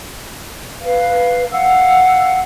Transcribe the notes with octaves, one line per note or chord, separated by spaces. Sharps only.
B4 F5
F5 F#5 E6